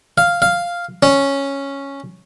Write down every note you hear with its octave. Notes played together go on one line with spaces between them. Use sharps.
F5
F5
C#4